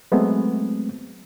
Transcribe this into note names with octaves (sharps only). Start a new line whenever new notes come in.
F#3 G#3 A3 B3 C4